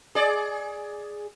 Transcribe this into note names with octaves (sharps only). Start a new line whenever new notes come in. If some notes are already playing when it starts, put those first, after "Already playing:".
G#4 D5